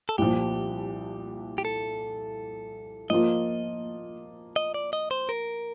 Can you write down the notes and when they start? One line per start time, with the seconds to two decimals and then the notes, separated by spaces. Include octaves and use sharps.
0.09 A4
0.18 C2 A#2 F3 G4
1.58 G4
1.65 A4
3.10 F3 A#3 F4 D#5
4.56 D#5
4.74 D5
4.93 D#5
5.11 C5
5.29 A#4